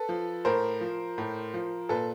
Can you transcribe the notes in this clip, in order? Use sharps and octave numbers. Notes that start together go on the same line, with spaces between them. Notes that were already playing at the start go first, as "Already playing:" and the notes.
Already playing: A4 B4
F3
A2 A#4 C5
F3
A2
F3
A#2 A4 B4